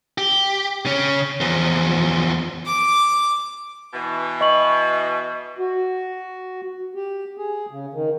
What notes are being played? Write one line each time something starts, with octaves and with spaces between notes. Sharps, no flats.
G4
C#3 C#4
E2 F3
D6
B2 E3
D#5 C#6 F#7
F#4
G4
G#4
C#3
D#3